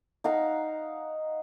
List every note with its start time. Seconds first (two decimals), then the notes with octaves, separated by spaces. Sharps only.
0.24 D#4 F5 F#5 A#5